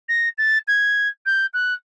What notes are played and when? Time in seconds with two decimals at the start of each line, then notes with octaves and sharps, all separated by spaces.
0.09 A#6
0.38 A6
0.68 G#6
1.26 G6
1.54 F#6